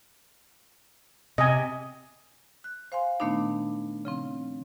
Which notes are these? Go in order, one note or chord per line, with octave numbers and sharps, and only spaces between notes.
C3 D#5 G#5
F#6
C5 F5 G#5 C6
A#2 D#3 A3 B3 D4 D#4
C#3 F3 C4